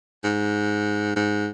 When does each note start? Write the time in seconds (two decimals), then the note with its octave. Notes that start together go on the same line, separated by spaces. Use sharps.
0.24 G#2
1.16 G#2